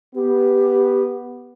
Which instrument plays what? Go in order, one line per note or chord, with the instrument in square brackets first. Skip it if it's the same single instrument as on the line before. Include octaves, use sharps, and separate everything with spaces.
[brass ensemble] B3 [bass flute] G4